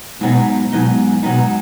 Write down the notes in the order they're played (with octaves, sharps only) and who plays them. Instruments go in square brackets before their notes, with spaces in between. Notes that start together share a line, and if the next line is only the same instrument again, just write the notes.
[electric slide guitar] G#2 F#3 B3 D#4 [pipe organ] B2
[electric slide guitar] G#2 F#3 B3 D#4 [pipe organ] B2
[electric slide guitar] G#2 F#3 B3 D#4 [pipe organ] B2